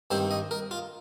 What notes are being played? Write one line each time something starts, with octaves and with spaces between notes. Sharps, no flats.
G2 D#3 C4 C5
D#5
A#4
F4